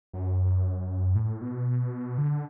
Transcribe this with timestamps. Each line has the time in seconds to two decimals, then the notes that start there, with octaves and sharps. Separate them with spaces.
0.13 F#2
1.15 A2
1.42 B2
2.18 D3